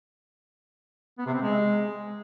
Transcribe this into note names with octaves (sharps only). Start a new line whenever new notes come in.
B3
C3
C4
G#3